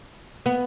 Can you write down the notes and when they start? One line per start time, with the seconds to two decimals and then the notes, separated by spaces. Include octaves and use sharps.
0.46 B3